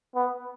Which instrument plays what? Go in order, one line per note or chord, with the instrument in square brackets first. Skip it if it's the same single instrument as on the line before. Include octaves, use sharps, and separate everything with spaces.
[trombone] B3